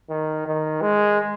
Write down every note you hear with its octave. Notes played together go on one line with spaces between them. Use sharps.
D#3
D#3
G#3